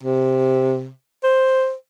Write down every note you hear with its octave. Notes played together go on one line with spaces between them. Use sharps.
C3
C5